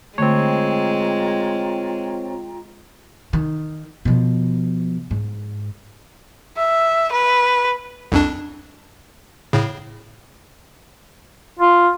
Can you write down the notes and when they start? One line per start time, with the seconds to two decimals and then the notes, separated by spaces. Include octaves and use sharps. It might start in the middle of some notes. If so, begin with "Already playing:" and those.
0.18 D3 G#3 A3 C4 F4 C#5 G5 A#5
3.33 D#3
4.05 B2 F3
5.11 G#2
6.57 E5
7.12 B4
8.12 C2 F2 D4
9.53 A2 C#3
11.59 F4